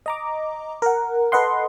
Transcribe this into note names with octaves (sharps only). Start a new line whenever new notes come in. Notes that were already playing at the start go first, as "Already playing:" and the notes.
D#5 A#5 D6
A#4 F#5
A4 B4 D#5 F#5 C6